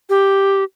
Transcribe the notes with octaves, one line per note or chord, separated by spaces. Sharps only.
G4